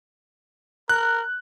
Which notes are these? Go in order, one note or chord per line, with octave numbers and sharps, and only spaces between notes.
A#4 F#6